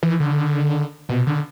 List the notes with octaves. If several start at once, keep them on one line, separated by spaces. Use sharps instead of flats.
E3
D3
B2
D3